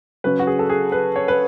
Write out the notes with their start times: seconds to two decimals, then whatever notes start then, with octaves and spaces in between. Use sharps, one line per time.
0.24 C#3 F#3 C#4 B4
0.39 F#4
0.47 G#4
0.59 A4
0.70 G#4
0.92 B4
1.16 C#5
1.28 B4